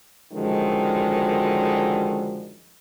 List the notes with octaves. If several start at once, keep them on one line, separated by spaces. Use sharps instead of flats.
F#2 D3 D#3 F3 G#3